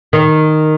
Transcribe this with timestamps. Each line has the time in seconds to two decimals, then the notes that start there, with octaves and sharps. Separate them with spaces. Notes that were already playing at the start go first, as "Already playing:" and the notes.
0.13 D#3